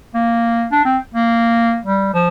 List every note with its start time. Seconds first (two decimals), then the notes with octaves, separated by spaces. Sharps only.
0.14 A#3
0.71 D4
0.85 C4
1.14 A#3
1.85 G3
2.14 F3